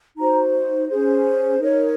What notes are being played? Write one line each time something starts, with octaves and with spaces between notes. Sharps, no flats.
D#4 F#4 C5 A#5
C#4 G#4 C5
D#4 A#4 C#5